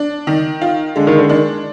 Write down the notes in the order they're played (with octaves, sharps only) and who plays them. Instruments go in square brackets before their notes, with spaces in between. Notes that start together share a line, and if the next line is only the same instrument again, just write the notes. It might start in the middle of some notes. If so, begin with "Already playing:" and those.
Already playing: [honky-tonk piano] D4
D#3
F4
[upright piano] D3 [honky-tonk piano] G#3
[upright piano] D#3
D3
[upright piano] D#3 [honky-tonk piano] D4